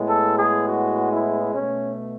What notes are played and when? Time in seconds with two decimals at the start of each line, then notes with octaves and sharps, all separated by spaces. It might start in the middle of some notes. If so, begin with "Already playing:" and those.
Already playing: A2 G#3 B3
0.09 A4
0.37 G#4
0.67 F#4
1.11 E4
1.53 B2 A3 C#4